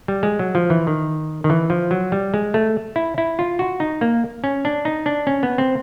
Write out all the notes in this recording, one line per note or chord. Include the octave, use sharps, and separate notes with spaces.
G3
G#3
F#3
F3
E3
D#3
D#3
E3
F3
F#3
G3
G#3
A3
E4
E4
F4
F#4
D#4
A#3
C#4
D4
D#4
D4
C#4
B3
C4